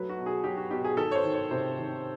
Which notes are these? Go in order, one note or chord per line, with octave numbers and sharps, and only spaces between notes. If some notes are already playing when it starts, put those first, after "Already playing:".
Already playing: F#3 A3 B4
F#4
B2
G#4
F#3 G4
F#4
B2 G4
G#4
D#3 A4
C#5
C5
D#3
C#5
C3 C5
D#3